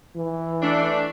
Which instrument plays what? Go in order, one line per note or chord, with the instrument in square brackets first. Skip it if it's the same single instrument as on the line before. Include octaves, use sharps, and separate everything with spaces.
[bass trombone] E3
[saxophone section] A3 D4